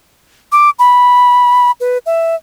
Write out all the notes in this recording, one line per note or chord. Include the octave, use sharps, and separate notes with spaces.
D6
B5
B4
E5